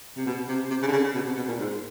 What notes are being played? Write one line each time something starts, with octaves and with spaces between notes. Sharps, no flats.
C3
B2
C3
C3
C#3
D3
C#3
B2
C3
B2
A#2
G#2